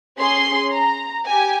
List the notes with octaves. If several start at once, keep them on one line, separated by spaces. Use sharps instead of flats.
C#4 G#4 C6
A#5
G4 G#5